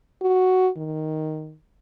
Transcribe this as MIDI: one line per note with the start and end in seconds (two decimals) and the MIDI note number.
0.22 0.69 66
0.77 1.55 51